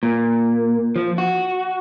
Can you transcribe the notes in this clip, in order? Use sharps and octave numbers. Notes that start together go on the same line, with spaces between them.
A#2
F3
F#4